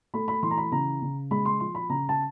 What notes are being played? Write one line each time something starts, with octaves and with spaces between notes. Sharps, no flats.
A3 B5
B5
E3 C6
A#5
B5
C#3 A#5
C#3
G#3 B5
C6
F3 C6
B5
C#3 A#5
A5